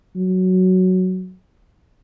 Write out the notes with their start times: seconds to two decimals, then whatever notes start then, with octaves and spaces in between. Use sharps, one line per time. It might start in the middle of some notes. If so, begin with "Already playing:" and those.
0.16 F#3